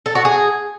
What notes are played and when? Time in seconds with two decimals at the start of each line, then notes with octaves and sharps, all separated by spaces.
0.06 A4
0.15 F#4
0.25 G#4